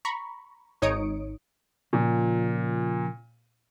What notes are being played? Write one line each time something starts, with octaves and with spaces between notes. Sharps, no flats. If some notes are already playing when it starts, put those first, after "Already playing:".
A#5 B5 C#6
G#1 D#4 C#5 D#6 C#7 D7
A#2 C#3 F3 F4